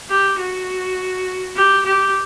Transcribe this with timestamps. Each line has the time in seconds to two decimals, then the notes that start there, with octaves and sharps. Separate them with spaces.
0.10 G4
0.39 F#4
1.57 G4
1.86 G4